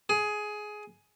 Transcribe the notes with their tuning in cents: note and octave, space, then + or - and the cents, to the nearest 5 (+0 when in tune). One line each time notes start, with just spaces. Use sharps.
G#4 +15